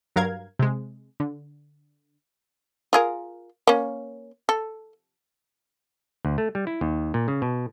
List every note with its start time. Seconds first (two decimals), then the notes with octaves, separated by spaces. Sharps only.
0.16 G2 F#3 A#4 F5 G#6
0.59 C3 G#3
1.20 D3
2.93 F4 G#4 A#4
3.67 A#3 C#4
4.49 A4
6.25 D2
6.38 A3
6.55 G3
6.67 E4
6.81 D#2
7.14 A#2
7.28 C#3
7.42 B2